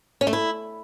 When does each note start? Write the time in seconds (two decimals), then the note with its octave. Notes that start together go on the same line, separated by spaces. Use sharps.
0.21 C#4
0.27 A3
0.33 E4